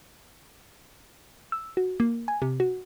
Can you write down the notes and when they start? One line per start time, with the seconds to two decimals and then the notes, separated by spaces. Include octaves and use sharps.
1.52 E6
1.77 F#4
2.00 A#3
2.28 G#5
2.42 C3
2.60 F#4